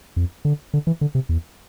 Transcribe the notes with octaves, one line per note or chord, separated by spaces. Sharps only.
F2
D3
D3
E3
D3
C3
E2